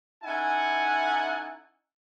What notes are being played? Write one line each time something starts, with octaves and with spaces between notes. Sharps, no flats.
C#4 D#4 E4 A4 F#5 G#5